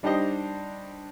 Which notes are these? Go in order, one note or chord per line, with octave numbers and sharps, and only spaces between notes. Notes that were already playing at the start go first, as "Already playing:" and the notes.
G3 D4 D#4 G4 C5 D#5